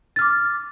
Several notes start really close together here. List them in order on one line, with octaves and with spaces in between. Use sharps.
A6 F6 D6